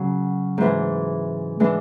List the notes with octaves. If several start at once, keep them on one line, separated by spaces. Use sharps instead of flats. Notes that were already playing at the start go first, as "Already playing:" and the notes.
Already playing: C#3 F#3 C#4
G#2 E3 G#3
E3 G#3 D4